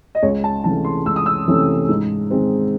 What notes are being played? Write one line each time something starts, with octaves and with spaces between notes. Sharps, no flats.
D#5
C#2 C#5
A5
C3 E3 A3 C#4 A5
C6
C#2 E6
D#6
E6
C3 E3 A3 C#4
G#2
D#3 G#3 C4